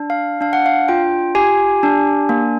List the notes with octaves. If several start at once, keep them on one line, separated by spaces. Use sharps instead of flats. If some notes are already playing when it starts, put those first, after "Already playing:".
Already playing: D4
F5
D4 F5
F#5
F5
F4 G5
G4 G#5
D4
A#3